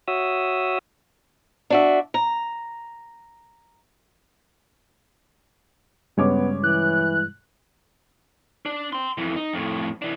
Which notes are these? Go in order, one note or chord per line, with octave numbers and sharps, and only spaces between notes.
F#4 C#5 E5 D#6 E6
D4 F#4 E5
A#5
G2 C#3 G3 G#3 B3 C#5 D6
E3 F#6
D4
G5 C6
F2 E3
D#4
F2 A2
E3 D4